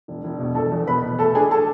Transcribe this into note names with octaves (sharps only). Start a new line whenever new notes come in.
E1
E1
B2
E1 A4 A5
E2
B2 B4 B5
B2
A3 A4 A5
D4 G#4 G#5
A4 A5